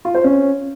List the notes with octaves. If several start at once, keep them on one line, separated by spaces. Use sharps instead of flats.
F4
C5
C#4